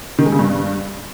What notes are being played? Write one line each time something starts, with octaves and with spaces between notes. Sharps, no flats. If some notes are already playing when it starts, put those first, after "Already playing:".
D#3
G#3
C#3
G2